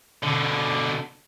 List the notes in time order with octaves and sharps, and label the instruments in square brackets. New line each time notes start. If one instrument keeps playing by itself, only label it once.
[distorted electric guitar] B2 D3